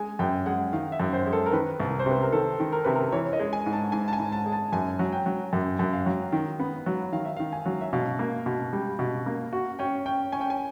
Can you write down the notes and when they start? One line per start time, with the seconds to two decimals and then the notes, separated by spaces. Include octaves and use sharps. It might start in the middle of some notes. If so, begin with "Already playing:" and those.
Already playing: G#3 G#5
0.19 F#2 G5
0.46 G#3 F#5
0.73 D#3 F5
0.92 E5
1.00 F#2
1.13 C5
1.26 G#3
1.33 A4
1.46 A#4
1.52 D#3 B4
1.80 C2
2.00 C5
2.06 C3 B4
2.22 A#4
2.32 D#3 A4
2.60 D#3
2.72 A#4
2.84 C3 B4
2.95 A#4
3.12 E3 C#5
3.33 D#5
3.39 G#3
3.53 G#5
3.66 G#2
3.73 A5
3.92 G#2 G#5
4.08 A5
4.13 G#5
4.19 G#2
4.32 A5
4.46 G#3
4.52 A5
4.72 F#2 G#5
4.99 F#3
5.12 G5
5.26 F#3
5.53 F#2
5.79 F#2
5.93 F5
6.06 F#3
6.32 D#3
6.60 B3
6.86 F#3
7.12 D#3 F5
7.25 E5
7.37 D#3 F5
7.52 G#5
7.66 F#3
7.81 E5
7.93 B2 F5
8.19 A#3
8.46 B2
8.73 G3
8.99 B2
9.26 A#3
9.53 F#4
9.79 C#4 G5
10.06 C#4 G5
10.32 C#4 G#5
10.41 G5
10.50 G#5